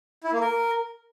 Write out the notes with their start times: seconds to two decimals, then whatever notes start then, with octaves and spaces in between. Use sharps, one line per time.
0.24 E4
0.32 A#3
0.41 A#4